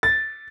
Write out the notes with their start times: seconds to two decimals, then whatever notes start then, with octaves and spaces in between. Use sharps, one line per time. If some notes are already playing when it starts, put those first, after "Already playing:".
0.03 A6